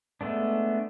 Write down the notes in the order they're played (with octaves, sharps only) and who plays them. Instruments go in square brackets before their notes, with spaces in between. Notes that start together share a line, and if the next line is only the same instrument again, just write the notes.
[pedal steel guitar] G#3 A3 B3 D4